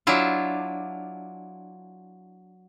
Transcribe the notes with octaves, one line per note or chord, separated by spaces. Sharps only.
F#3 D4 E4 F4